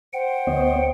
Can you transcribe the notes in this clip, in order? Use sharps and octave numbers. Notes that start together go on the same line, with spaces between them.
C5 F#5 G5
D2 B3 C#5 D#5